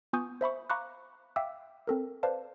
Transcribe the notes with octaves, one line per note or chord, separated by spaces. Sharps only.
B3 F4 G#5 C#6 D#6 G6
C5 E5 B5 C#6
F5 A#5 B5 C#6 D6 F#6
E5 F5 G5 D6 E6
C4 A4 A#4
B4 C5 D5 F5 A5